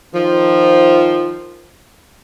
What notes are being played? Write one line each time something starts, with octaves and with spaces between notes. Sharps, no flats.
D#3 F3